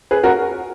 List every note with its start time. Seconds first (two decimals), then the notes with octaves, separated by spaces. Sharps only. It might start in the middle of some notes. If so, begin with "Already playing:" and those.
0.11 G#4 B4
0.23 F#4 A#4